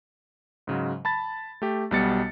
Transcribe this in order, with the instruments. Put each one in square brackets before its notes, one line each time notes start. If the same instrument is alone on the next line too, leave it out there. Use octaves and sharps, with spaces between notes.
[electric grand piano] G#2 C#3 F#3 G#3
A5 B5 A6
A3 G4
B1 B2 G3 B3 A6 C#7